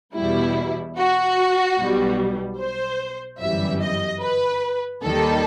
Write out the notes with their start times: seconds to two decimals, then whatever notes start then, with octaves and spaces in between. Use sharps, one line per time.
0.15 E2 B2 G3 E4
0.97 F#4
1.78 B1 B2 G3
2.59 C5
3.40 G1 F#2 E3 G3 E5
3.81 D#5
4.21 B4
5.03 D#2 D#3 G3 A4